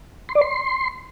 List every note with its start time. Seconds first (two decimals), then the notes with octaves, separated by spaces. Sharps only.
0.29 C6
0.35 D5
0.41 C6